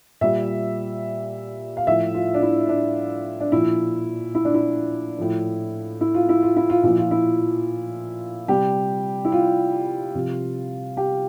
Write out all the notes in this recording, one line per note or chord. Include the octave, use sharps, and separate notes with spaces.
A#2 G3 E5
F5
A2 F3 E5
F4
D4
E4
D4
D4
A#2 F3 E4
E4
D4
E4
A2 F3
E4
F4
E4
F4
E4
F4
A#2 F3 E4
F4
E4
C3 G3 G4
E4
F4
C3 F3
G4